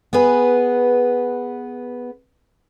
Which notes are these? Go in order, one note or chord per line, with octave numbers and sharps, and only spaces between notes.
B3 G#4 B4 G#5